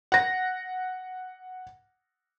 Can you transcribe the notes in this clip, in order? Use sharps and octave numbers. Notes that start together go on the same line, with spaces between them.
F#5 A#6